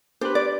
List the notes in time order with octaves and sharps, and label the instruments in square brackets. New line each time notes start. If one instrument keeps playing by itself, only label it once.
[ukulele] D4 G4 B4 C5
D5